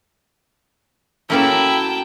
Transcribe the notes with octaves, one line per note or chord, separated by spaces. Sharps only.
F#2 A3 A#3 C#4 E4 A4 G5 A5